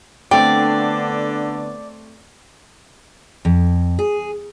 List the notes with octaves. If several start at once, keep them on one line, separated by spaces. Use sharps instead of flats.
D3 A3 B3 C4 D4 D5 G5
F2
G#4